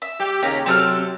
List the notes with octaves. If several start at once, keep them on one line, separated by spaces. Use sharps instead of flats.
E5
G4
D#2 C#3 C#4 G4 A#5
C3 F#3 C4 A4 F6